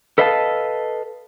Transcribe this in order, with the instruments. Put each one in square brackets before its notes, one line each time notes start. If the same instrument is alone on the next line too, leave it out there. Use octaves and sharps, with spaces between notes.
[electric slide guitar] A4 B4 D#5 F5 G#5 A5